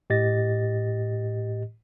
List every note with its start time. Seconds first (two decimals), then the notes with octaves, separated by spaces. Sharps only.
0.10 A2 G4 D#5 A6 A#6